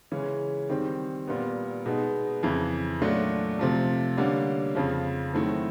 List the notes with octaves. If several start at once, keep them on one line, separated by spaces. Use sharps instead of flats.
C#3 E3 G#3 C#4
D#3 G3 C4
A#2 G3 B3
B2 G#3 B3 D#4
F2 C#3 E3
A#2 F#3 A3 D4
C3 F3 A3
D3 G3 A#3 C#4
F2 C#3 F3
D#3 F#3 A3 C4 E4